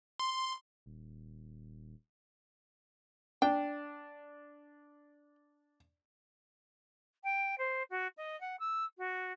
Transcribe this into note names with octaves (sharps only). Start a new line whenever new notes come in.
C6
D#1
D4 G5
G5
C5
F#4
D#5
F#5
E6
F#4